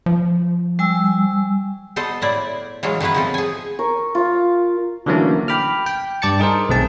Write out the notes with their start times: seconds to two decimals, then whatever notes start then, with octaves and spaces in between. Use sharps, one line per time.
0.06 F3
0.79 G3 G#5 E6
1.96 B3 A4 C5 D#5
2.22 A2 E4 D5
2.83 E3 F#3 G#3 F4
3.00 D#3 A3 B3 E4 B4
3.15 F3 C4 A4
3.34 G#4 G#5
3.79 A#4 C#6
4.15 F4 F5
5.06 D3 E3 F#3 A3 A#3 C#4
5.48 G5 B5 D6 F6
5.86 G5
6.22 G2 D5 A5 A6 C#7
6.39 D#4 G#4 A#4 C5
6.69 B1 D#3 A3 C4 G#4 A5